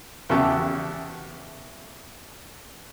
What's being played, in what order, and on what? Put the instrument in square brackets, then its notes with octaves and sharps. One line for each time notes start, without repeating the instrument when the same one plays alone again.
[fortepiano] E2 C#3 F#4 G4 E5 A5